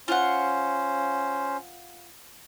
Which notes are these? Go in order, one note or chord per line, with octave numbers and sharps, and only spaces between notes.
C#4 F4 C5 F#5